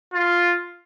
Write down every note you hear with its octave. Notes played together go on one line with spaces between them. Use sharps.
F4